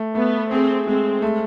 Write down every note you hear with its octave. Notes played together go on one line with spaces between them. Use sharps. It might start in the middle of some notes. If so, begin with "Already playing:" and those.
Already playing: A3
A3 B3
C4 G#4
G#3 C4
A3